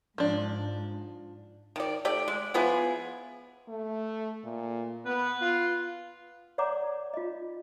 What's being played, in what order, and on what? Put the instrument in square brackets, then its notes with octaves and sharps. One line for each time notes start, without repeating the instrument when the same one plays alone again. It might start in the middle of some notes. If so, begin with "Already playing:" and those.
[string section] G#2 [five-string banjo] F3 D4
[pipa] D#3 D5
A3 G4 D5
G#3
F3 B3 E4 G#4
[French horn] A3
A#2
[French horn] B3 [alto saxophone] B4
[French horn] F4
[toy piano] C#5 D5 F#5 A#5 D6
F4 D#5